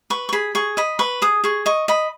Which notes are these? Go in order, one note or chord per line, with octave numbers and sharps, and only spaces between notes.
B4 C#6
C#6
G#4 B5
G#4 C#6
D#5 B5
B4 C#6
G#4 D#6
G#4 C#6
D#5 C#6
D#5 B5